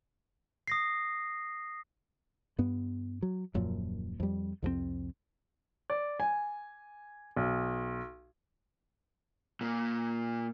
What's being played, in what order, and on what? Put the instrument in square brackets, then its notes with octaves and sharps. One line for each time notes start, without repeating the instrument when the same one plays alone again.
[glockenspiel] D#6 A#6 C7
[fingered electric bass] G2 B3
F#3
D#1 F#2 A#2 F3
F2 G3
C2 F2 F3 C4
[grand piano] D5
G#5
B1
[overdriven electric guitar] A#2 A#3